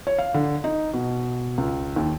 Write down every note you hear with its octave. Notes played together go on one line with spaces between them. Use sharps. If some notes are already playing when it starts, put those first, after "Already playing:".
C#5
F5
D3
D#4
B2
C#2
D#2